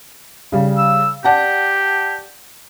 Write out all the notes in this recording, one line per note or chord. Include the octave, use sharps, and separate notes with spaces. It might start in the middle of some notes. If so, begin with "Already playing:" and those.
C#3 G3
E6
G4 D5 F#5 A5